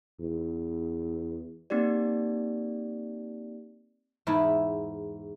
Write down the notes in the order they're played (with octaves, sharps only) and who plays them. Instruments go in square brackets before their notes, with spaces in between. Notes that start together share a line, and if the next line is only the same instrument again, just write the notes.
[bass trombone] E2
[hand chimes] A#3 C4 D#4 G4 D5
[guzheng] E2 G#2 E4 A5 B5